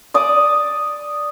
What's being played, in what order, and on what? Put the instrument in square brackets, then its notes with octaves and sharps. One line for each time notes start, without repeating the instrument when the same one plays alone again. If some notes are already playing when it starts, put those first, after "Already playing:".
[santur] D5 D#6